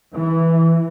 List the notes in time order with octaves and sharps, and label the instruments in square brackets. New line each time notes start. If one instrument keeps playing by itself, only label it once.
[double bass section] E3